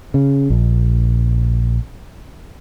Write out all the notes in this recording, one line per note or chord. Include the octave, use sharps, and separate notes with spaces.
C#3
A#1